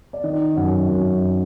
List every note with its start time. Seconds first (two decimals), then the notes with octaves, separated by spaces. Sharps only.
0.13 D5
0.24 D#3 D#5
0.56 F#2 F#5
0.88 F#2